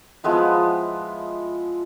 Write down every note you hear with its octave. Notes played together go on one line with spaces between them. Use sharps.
F3 G#3 B3 E4